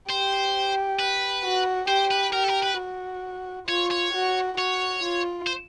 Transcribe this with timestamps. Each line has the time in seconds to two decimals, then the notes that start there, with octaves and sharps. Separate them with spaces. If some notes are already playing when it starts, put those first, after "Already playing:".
0.10 G4 C5
0.99 B4
1.44 F#4
1.88 G4 C5
2.11 B4
2.33 G4 A#4
2.44 A4
2.49 A#4
2.63 B4
2.78 F#4
3.67 F4 C#5
3.91 C#5
4.13 F#4
4.58 F#4 C#5
5.03 F4
5.47 C5